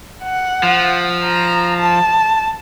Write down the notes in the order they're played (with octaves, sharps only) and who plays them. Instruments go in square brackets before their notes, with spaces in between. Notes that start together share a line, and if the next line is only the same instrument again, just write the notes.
[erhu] F#5
[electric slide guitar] F3
[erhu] A#5
A5